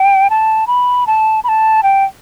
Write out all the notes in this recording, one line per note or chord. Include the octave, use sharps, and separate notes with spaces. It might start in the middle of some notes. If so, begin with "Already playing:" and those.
Already playing: G5
A5
B5
A5
B5
A5
G5